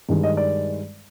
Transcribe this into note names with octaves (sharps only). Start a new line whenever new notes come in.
G2 D#3 G#3
D#5
D5